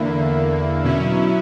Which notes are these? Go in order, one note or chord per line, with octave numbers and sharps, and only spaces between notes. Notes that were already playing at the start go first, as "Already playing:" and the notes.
Already playing: E2 D3 A#3 E4
B2 F#3 C#4 E4